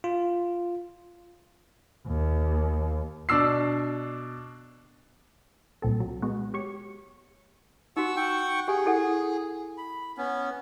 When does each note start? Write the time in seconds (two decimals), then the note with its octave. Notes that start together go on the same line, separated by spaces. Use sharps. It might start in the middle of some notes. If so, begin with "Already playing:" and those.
0.04 F4
2.07 D#2
3.29 B2 D4 D6 E6 C7
5.82 C2 A#2 C4 A4
6.00 F#3
6.22 G#3 B3 F#4
6.54 G4 C#5 C#6
7.97 D#4 F#4 F#5 C#6 E6
8.16 F#5 G5 C#6
8.68 G4 G#4 G#5
8.86 E4 A4 F#5
9.78 B5
10.17 B3 C#4